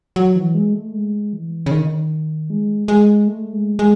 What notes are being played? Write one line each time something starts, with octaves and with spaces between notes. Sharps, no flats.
F#3
E3
G#3
A3
G#3
E3
C#3
D#3
G#3
G#3
A3
G#3
G#3